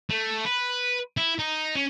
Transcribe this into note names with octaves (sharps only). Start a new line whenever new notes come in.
A3
B4
E4
D#4
C#4